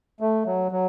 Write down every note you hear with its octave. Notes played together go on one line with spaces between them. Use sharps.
A3
F#3
F#3